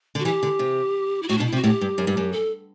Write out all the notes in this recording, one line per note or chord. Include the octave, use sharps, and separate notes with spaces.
D3
F#4
E3 G4
D3
C3
E4
A2 F#4
B2 D4
E4
C3
F#4
A2 G4
G2
F#2
G2
F#2
A4